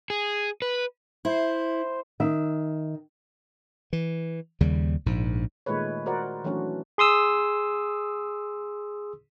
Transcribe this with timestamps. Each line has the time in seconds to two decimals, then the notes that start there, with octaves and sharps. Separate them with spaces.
0.10 G#4
0.62 B4
1.25 E4 C5
2.20 D#3 E5
3.93 E3
4.61 D#2 C#3 G3
5.06 A#1 G#2
5.66 A#2 D#3 G#3 A3 B4 C#5
6.06 F#4 A#4 C5 D5 F#5
6.44 E3 F#3 A3 C#4 D4 F#4
6.98 G#4 C6 D#6 E6